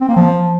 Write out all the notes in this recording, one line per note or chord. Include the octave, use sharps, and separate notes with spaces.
C4
A#3
F3